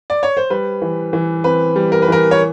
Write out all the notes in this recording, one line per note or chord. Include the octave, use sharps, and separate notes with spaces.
D5
C#5
C5
G3 B4
E3
E3
C4 B4
G3
A#4
B4
E3 A#4
C#5